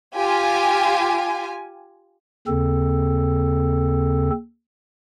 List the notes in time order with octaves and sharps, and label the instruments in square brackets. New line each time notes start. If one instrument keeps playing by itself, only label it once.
[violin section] F4 G4 G#5
[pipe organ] D#2 C#3 C4 A4